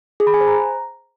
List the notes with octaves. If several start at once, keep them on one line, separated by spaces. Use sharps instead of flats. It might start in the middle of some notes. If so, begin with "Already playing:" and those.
G#4
B5
G#5
C5
A#5